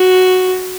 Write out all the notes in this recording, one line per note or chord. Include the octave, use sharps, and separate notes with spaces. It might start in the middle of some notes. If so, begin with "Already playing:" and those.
Already playing: F#4